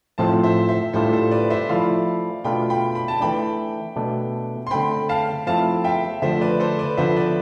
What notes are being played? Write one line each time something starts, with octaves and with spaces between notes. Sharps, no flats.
A2 F3 C4 F4 A5 C6
C5 E5
C5 E5
A2 G3 D4 F4 A4 C5
A4 C5
B4 D5
C5 E5
F3 A3 E4 D5 F5
B2 A3 D4 F4 G5 B5
G5 B5
B5
A5
E3 A3 D4 G5 B5
B2 A3 D4
C6
D3 A3 C4 G5 B5
F5 A5
F3 A3 C4 E4 F5 A5
E5 G5
D3 F3 A3 C5 E5
B4 D5
A4 C5
B4 D5
D3 F3 B3 C5 E5
B4 D5